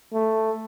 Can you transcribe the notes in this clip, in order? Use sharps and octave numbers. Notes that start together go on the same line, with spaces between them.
A3